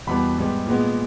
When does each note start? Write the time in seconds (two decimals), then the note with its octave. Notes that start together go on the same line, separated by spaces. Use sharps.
0.07 E2 B2 G3 B3 B5
0.37 G#2 G3 B3
0.67 A#2 G#3 B3